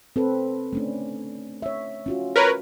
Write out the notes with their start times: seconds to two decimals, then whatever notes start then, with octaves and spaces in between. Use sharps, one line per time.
0.16 C4 A4 B4
0.73 A3 C#4 D4
1.62 C#5 E5
2.06 C#4 F4 F#4
2.36 A#4 B4 C#5